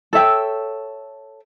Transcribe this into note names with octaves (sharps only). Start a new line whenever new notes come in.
A4 C#5 E5 G5